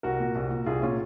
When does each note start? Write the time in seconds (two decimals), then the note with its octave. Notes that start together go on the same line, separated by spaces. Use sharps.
0.03 C2 F#4 A#4
0.20 A#2
0.35 C2
0.50 A#2
0.66 C2 F4 G#4
0.82 A#2 C#4 F4